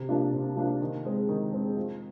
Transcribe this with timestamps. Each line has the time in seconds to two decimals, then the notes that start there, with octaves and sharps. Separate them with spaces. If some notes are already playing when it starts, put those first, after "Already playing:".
Already playing: C3
0.09 F3 A#3 D4 F4
0.32 C3
0.56 F3 A#3 D4 F4
0.81 D#3
1.05 G#3 C4
1.29 D#3
1.52 G#3 C4
1.76 F3